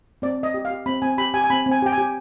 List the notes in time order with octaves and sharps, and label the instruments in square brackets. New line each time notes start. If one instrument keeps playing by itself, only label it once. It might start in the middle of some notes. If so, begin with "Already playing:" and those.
[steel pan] C4 D5
C4
D#5
G4
F5
G4
C4 B5
C4 G#5
G4 B5
G4 G#5
G#5
C4 B5
C4
G#5
G4 G5
G#5
G4